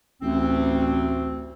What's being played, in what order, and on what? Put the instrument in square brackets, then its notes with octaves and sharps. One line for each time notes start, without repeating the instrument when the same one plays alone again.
[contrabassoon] A1 [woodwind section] D2 C4